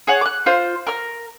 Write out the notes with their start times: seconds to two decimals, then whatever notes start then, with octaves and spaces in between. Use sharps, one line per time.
0.07 G#4 C#5 F#5
0.21 D6 F#6
0.46 F4 C5
0.87 A#4 F6